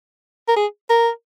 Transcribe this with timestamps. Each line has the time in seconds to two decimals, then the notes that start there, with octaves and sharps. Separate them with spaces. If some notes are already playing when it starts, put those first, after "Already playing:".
0.48 A#4
0.56 G#4
0.90 A#4